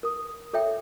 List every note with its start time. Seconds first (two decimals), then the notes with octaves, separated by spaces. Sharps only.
0.03 A#4 D#6
0.53 A4 C#5 E5 G5